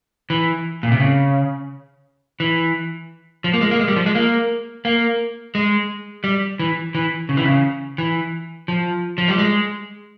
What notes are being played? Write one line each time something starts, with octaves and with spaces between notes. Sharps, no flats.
E3
A#2
C3
C#3
E3
F3
A#3
G#3
A#3
G#3
G3
F3
G#3
A#3
A#3
G#3
G3
E3
E3
C#3
E3
C#3
E3
F3
F3
G3
G#3